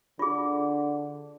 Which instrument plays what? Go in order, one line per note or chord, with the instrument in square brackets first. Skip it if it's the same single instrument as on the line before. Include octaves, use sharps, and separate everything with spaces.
[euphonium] D3 [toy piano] F4 G#4